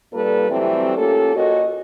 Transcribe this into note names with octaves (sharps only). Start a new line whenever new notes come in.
G2 A#2 G3 A#3 A4 B4
C3 E3 F#3 G3 A3 C4
A#3 C#4 F4 G4 A4
A#2 F#4 A#4 C#5 D#5